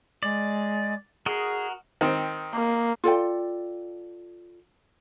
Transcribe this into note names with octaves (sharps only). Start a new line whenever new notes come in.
G#3 D5
F#4 G#4 A#4 D#5
D#3 C4
A#3
F4 A4 D5 G5